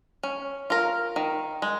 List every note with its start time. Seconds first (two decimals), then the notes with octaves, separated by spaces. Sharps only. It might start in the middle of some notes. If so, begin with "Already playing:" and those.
0.23 C#4
0.70 F4 A#4
1.16 D#3
1.62 G#3